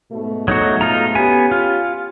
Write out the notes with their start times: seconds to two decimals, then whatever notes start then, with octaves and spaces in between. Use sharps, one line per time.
0.12 G#2 B2 A3
0.48 F#3 D#4 F#4
0.81 D#4 F4 A#5
1.15 B3 C#4 G4 G#5
1.51 F4